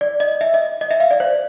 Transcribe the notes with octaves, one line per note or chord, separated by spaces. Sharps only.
D5
D#5
E5
D#5
D#5
E5
F5
D5
C5